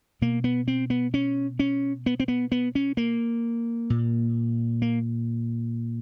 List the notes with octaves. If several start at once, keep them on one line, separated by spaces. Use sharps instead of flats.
B2 A#3
B3
C4
B3
C#4
C#4
B3
C4
B3
B3
C#4
A#3
A#2
A#3